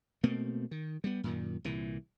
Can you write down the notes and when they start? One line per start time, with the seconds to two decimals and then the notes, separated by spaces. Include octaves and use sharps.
0.23 B2 A3 A#3 C4
0.71 D#3
1.04 G3 B3
1.24 F#2 A#2 D#3
1.64 C2 A#2 E3